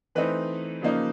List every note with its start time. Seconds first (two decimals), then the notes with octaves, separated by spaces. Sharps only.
0.15 E3 A3 C4 D#4 B4
0.82 C#3 F3 A#3 D#4